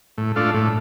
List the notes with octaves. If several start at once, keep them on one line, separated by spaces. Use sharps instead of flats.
A2
A3 D4 F4
A2